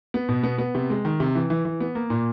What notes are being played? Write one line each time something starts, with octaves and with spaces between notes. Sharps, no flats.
B3
B2
B3
B3
C3
G#3
D#3
C3
E3
E3
E3
B3
A#3
A#2